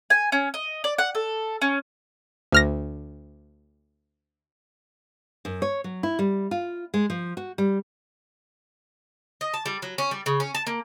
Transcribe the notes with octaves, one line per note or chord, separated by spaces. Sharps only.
G#5
C#4
D#5
D5
F#5
A4
C#4
D2 F6 A#6
F#2
C#5
F#3
E4
G3
F4
G#3
F3
F#4
G3
D#5
A5
G3
F#3
C#4
G3
C#3
C#4
A5
A#3